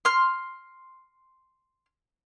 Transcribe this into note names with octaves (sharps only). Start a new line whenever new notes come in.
C6 F6